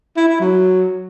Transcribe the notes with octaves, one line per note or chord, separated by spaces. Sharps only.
E4
E4
F#3